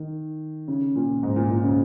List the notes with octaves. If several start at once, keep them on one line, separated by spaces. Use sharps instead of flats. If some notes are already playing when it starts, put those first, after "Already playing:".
Already playing: D#3
C#3
A#2
G#2
A#2
A#2
C#3